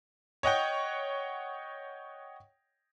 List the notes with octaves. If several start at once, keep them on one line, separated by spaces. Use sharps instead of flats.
C#5 D#5 F#5 G5